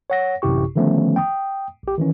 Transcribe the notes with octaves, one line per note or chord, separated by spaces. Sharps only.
C#5 F#5 A#6
A1 F#2 C3 E4 G4 C#6
D3 D#3 F3 A3 B3 C#4
G5 D#6
A#1 G4
D#3 E3 C#4